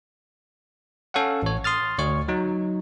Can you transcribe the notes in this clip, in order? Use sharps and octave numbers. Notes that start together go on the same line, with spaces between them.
C#4 A4 C#5 F5 F#5
A1 C#5
C6 D#6 F6 A6
D2 C#5 C#6
F#3 D#4